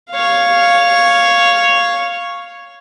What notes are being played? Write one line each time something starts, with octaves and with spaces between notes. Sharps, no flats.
C#5 F5